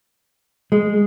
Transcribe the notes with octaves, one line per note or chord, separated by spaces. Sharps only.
G#3